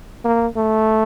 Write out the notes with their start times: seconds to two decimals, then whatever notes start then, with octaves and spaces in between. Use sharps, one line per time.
0.25 A#3
0.56 A3